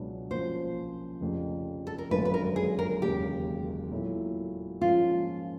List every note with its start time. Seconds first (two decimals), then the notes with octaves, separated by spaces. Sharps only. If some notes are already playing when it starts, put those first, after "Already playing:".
Already playing: C#2 B2 F#3 B3 D4
0.30 A#1 A#2 F3 A#3 C#4 C5
1.20 F1 F2 C#3
1.87 A4
1.98 A#4
2.11 G#1 F#2 D3 F#3 A#3 B4
2.25 B4
2.34 A#4
2.56 G#4
2.79 A#4
3.02 E1 D#2 C#3 F#3 A#3 G4
3.92 A#2 F#3 B3 E4 A4
4.81 G#2 F3 A#3 C#4 F4